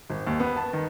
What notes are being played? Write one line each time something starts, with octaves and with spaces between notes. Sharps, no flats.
G#1
D#2
B3
A5
D#3